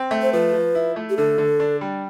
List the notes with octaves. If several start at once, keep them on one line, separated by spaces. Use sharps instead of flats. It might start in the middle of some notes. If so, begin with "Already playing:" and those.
Already playing: C4
A3
C5
F3 B4
F3
E4
A3
G4
D3 A4
D3
D4
G3